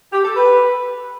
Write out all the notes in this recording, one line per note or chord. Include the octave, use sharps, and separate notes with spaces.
G4
A4
B4